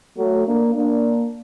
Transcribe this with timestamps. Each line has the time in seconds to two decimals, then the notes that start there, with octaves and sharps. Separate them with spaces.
0.18 F#3 A3
0.47 A#3 D4
0.75 A#3 D4